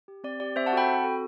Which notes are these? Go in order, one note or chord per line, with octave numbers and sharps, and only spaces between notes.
G4
C4 D5
G4 D5
C4 C5 E5
F#5 A5
F#4 A4 G5 B5
C4
F#4 A4